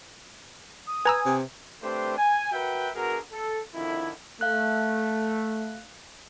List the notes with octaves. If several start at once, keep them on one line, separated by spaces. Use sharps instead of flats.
D#6
B4 G#5 A#5 E6
C3
A3 C4 D4 G4 B4 C5
G#5
F#4 A#4 B4 E5 F#5 G5
B2 D3 F#4 G#4 A#4
A4
F2 D3 D#3 E4
A3 F5 F#6